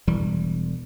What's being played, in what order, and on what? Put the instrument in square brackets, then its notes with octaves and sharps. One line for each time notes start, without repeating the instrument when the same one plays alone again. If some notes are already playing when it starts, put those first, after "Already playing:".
[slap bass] E1 E3 G3